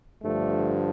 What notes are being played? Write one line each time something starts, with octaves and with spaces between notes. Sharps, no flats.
G2 D3 F3 A3